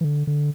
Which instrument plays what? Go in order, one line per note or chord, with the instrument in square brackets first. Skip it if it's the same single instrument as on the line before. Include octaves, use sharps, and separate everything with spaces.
[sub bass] E3
D3
D3